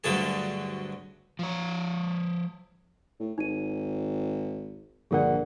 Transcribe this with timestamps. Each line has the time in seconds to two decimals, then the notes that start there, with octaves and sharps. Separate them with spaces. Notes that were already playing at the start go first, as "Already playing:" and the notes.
0.04 D2 G2 D3 F#3 G#4 A5
1.39 F3 C#5
3.20 A2
3.38 G#1 D#4 D#7
5.11 A#1 G2 D3 G#4 A#4 D5 F#5